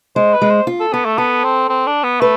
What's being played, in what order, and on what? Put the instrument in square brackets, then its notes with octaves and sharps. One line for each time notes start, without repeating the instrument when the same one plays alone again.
[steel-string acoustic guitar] G#3 [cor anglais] C5
[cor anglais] B4
[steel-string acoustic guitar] G#3
[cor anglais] C5
[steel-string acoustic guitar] F4
[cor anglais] A4
[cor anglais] B3 [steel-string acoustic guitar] A4
[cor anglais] A3
[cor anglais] B3 [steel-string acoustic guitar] A4
[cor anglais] C4
C4
D4
B3
[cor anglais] A3 [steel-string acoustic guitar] B4